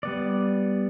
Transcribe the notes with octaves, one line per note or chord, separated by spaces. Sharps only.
G3 B3 D5